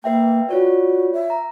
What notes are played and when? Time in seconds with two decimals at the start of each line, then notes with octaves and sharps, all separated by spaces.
0.04 A#3 B4 E5 G5
0.49 F4 F#4 C#5 D5
1.13 E5
1.30 A#5